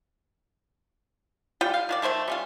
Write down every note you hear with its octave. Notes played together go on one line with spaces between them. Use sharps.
G3 F4 G5
F5
D#3 F#4 D5
D#3 A3 C5 E5
G3 C#4 F4